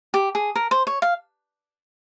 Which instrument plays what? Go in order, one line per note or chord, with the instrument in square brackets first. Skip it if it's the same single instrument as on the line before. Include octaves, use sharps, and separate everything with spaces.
[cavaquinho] G4
G#4
A#4
C5
C#5
F5